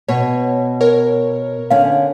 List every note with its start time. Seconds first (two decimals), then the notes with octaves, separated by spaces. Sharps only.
0.09 B2 C#5
0.81 A#4 C#5
1.71 D3 C#4 F5